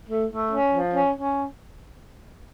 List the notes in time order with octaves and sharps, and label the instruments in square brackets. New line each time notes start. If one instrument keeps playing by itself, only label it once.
[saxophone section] A3
A3
C#4
F3
C#4
C#4